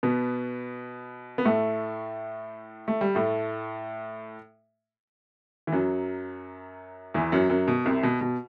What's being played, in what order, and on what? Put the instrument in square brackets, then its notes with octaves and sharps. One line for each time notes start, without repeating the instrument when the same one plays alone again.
[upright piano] B2 B3
B3
A2 A3
A3
G3
A2 A3
E3
F#2 F#3
E2 E3
F#2 F#3
F#2 F#3
B2
C2 C3
B2
B2